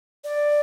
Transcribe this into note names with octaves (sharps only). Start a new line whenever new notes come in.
D5